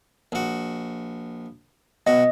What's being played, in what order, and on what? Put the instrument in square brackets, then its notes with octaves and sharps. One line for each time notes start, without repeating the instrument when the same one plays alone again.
[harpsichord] A#1 F#4
[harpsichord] B1 F#4 [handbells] D#5